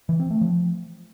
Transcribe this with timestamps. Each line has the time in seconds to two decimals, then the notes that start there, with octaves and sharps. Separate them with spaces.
0.09 E3
0.20 C4
0.31 A3
0.41 F3